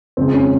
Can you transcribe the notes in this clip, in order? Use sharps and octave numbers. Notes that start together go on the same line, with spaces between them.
F2 C#3 G#3 C4
C#4